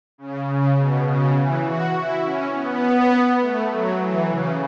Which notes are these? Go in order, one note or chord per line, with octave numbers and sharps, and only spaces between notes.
C#3
C#3
B2
C#3
E3
F#4
E4
C#4
B3
A3
F#3
E3
C#3